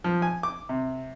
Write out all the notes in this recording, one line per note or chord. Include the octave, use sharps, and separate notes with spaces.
F3
G#5
D6
C3